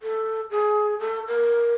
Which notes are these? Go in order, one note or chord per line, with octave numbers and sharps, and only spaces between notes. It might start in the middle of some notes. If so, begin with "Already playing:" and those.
A4
G#4
A4
A#4